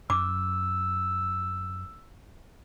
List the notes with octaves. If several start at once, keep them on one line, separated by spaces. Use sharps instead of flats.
F#2 D6 E6